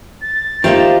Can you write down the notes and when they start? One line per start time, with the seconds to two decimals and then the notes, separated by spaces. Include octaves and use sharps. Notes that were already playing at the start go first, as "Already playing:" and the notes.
0.22 A6
0.64 D#3 A#3 D#4 F4 G4 C5 E5